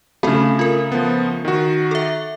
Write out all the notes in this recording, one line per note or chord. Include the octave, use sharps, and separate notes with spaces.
C#3 A3 C4 A4 B5
F4 A#4
F3 B3
D#3 F#4
A4 E5